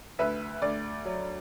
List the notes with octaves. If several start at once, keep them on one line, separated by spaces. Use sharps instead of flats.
D2 B4 E5
D2 D5
F#3